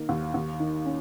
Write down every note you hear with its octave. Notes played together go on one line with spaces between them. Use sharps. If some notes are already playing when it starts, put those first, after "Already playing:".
Already playing: D#3 A#3
D#2
D#2
D#3
C#4